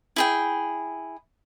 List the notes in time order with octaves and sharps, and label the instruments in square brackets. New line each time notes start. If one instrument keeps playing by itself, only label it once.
[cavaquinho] E4 G#4 G5